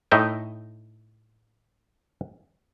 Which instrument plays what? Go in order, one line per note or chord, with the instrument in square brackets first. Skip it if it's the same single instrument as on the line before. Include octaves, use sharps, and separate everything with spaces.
[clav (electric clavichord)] A2 D#4 D#5 E5 G5